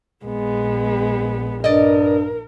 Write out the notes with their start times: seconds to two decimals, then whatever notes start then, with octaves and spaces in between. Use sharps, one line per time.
0.25 A#1 G#3 B3
1.64 G2 A#4 D5 D#5